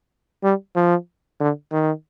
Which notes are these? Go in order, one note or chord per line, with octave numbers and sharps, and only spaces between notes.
G3
F3
D3
D#3